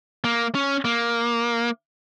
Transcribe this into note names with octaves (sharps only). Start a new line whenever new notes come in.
A#3
C#4
A#3